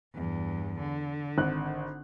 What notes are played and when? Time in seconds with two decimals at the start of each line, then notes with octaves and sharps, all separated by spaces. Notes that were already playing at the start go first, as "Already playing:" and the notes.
0.15 E2 G2
0.78 D3
1.38 G#1 F#6